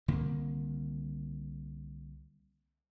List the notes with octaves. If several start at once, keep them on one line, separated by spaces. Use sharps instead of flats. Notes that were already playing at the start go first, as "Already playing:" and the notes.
C2 D3 D#3 A#3